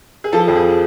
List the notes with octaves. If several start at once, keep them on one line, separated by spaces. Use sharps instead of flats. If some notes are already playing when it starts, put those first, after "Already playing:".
G#4
F3 A4
F2
G#4